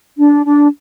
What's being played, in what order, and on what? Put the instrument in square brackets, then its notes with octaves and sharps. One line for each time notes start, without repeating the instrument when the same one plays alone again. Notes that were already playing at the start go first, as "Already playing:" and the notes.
[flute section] D4
D4